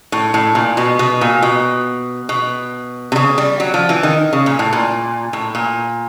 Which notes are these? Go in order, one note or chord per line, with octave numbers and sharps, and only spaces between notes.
A2
A2
A#2
B2
B2
A#2
B2
B2
C3
C#3
G3
F#3
F3
E3
D#3
C#3
A#2
A2
A#2
A2
A#2